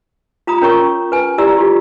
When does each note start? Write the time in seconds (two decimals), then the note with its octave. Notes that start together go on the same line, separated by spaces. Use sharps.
0.47 F4 A#5 B5 D#6
0.62 C#4 A#4 C#5 A#5 C#6
1.12 B4 G#5
1.38 E4 G4 D5 A#5 E6
1.58 F4 G4